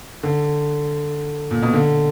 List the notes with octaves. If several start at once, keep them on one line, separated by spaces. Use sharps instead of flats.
D3
A#2
B2
D3